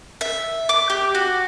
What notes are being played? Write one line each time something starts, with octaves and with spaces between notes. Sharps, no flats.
E5
D6
G4
F#4